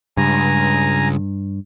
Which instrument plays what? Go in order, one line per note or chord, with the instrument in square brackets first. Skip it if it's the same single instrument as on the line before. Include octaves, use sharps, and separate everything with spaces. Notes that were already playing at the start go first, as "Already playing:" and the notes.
[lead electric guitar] C#2 [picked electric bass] G2 [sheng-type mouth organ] G#5 A#5